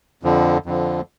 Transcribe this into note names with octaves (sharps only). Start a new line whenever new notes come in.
F2 D3 F3
F2 D3 F3